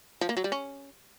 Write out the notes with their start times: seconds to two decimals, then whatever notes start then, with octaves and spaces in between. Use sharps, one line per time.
0.21 F3
0.29 A#3
0.37 F#3
0.44 G3
0.52 C#4